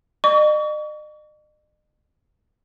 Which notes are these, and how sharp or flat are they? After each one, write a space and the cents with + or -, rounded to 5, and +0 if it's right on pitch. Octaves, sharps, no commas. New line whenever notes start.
D#5 -45 C#6 +40